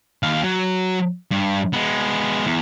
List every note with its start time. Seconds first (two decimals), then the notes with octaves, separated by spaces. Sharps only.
0.23 D#2 F5
0.43 F#3
1.31 G2
1.73 G#3 B3
2.46 E2